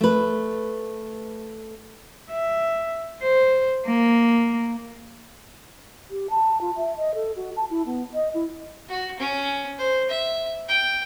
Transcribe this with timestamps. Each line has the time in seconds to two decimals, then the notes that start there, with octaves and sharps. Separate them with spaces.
0.01 A3 B4
2.31 E5
3.22 C5
3.87 A#3
6.10 G4
6.30 A5
6.61 F4
6.76 E5
6.97 D#5
7.15 A4
7.36 F#4
7.56 A5
7.70 E4
7.86 B3
8.14 D#5
8.34 E4
8.89 F#4
9.20 C#4
9.78 C5
10.10 E5
10.68 G5